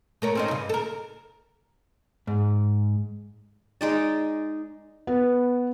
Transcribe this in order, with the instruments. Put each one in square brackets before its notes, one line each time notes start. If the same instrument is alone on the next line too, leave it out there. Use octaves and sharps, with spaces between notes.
[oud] A3 A#4 C#5
C4 C#4 D#4
G2 C#3
A4 A#4
[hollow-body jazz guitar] G#2
[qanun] G#3 D#4 D5
[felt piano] B3